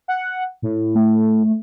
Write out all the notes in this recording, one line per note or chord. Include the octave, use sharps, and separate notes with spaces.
F#5
A2
A3